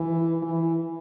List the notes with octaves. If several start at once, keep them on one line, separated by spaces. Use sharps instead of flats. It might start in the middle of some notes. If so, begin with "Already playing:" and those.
Already playing: E3
E3